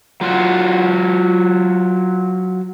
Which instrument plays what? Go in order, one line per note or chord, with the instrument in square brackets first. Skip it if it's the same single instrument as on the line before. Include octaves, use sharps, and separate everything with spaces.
[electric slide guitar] F#3 F4 F#4